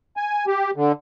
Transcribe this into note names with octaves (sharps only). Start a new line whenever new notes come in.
G#5
G4
D3